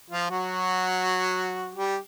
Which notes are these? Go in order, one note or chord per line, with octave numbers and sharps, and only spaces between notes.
F3 F4
F#3 F#4
G3 G4